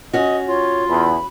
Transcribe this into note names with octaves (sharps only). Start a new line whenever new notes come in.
C#4 F#4 D#5
F4 C#5
E2 B5